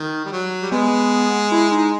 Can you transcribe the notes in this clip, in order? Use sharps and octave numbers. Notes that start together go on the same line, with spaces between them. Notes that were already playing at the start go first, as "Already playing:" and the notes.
Already playing: D#3
G3
F#3
G3
G#3 B3
E4
D#4